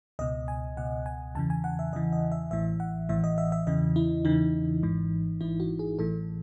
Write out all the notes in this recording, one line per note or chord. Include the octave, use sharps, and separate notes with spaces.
C#2 B2 D#5
G#5
C#2 B2 F#5
G#5
E2 C#3 E3 A5
G#5
F#5
E5
E2 C#3 E3 D#5
D#5
E5
A1 A2 E3 E5
F#5
A1 A2 E3 E5
D#5
E5
E5
E2 C#3 E3 D#5
E4
E2 C#3 E3 D#4
G#1 G#2 E3
G#1 G#2 E3 E4
F#4
G#4
A1 A2 E3 A4